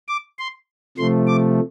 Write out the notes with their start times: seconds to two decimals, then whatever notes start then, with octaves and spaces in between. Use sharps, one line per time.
0.08 D6
0.39 C6
0.98 C3 F3 A3 C6
1.27 D6